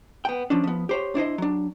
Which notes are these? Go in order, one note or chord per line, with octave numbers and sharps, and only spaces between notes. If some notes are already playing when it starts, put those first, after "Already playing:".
B3 G5
F3 C#4 D4
F3 B3
G4 C5 C#5
D4 E4 C5 D#5
F#3 D4